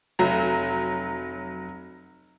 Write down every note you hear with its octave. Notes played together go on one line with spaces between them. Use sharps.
F1 F#3 A#5